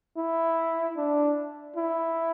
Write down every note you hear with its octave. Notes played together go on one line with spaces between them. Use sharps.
E4
D4
E4